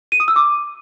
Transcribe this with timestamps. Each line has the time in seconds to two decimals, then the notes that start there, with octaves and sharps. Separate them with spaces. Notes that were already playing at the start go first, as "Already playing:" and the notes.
0.12 D#7
0.20 D#6
0.28 E6
0.36 D6